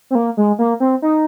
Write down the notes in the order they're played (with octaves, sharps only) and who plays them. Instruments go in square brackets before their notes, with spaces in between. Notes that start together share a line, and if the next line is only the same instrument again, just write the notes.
[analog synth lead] C4
A#3
G#3
A#3
C4
D#4